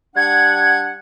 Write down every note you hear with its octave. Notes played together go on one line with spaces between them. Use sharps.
G3 D4 F#5 G#6